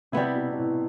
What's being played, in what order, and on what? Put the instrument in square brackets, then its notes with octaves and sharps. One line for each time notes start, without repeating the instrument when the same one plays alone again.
[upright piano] C3 [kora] G3 B3 E4
[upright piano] B2
B2
A2